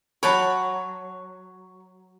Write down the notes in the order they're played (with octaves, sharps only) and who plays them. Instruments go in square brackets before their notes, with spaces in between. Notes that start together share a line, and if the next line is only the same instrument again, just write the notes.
[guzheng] F#3 G5 [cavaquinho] C#5 F#5 A5 [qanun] B5